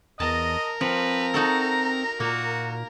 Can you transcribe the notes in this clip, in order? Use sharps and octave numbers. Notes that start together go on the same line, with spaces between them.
E2 A#4 D#5 A5
F3 C4 B4
D#4 F#4 A4 A#5
A#2 A#3 F#4